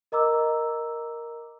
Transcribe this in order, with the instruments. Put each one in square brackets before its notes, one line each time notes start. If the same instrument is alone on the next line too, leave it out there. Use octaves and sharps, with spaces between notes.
[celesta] A#4 D#5 A#5 D6 E6